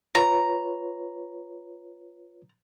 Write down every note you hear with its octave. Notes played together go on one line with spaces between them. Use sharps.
F4 B4 C#5 A#5